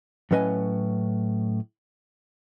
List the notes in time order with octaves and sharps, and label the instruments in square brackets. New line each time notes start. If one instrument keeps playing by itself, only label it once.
[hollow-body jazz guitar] A2 F#3 C#4 B4 D#5 G#5